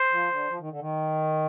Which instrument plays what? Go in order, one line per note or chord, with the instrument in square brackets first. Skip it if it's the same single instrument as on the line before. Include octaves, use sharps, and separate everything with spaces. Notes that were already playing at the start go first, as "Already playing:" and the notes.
Already playing: [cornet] C5
[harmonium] F3
D3
F3
D#3
D3
D#3